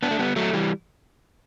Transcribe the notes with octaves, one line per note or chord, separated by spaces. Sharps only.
B3 D4
A3
G3 B3
F#3 A3
E3 G3